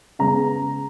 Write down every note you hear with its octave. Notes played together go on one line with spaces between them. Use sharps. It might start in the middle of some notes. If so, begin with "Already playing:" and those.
C#3 G#3 B3 A#5